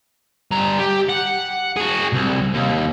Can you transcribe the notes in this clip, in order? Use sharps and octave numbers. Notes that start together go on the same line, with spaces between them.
G2 A#5
G4
F#5
F#4 G#4
C2
D#2